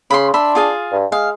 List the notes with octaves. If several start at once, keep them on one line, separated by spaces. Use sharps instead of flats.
C#3 B5 C6
D4 E5 B5 C6
F4 G#4 F5
G2
G#3 F5